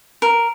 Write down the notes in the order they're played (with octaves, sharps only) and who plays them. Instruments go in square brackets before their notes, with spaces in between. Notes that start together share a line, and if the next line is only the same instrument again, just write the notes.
[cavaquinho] A#4